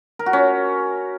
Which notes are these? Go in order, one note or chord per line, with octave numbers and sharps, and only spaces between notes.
A#4
F#4
C#4